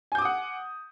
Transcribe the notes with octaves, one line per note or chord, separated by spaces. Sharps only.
F#5 G#5 D6 D#6 G6